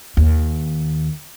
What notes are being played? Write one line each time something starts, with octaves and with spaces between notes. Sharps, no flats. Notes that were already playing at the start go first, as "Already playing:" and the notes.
D#2